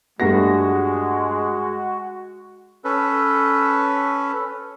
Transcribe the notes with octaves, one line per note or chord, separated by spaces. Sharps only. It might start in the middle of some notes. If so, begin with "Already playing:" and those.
G2 G#3 A3 F#4 A#6
C#4 A4 B4